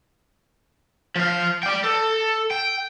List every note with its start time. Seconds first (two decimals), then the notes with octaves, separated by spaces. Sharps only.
1.16 F3 F5
1.63 D5 G5
1.84 A4
2.51 G5